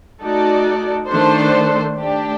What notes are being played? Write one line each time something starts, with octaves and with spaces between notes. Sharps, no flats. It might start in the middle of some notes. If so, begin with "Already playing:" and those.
A3 D#4 F#4 A4 D5
D#3 A3 D4 A4 C5
A3 D4 G4